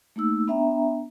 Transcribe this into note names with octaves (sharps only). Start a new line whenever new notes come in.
A3 A#3 D#4 E6
B3 D4 E5 G5 A#5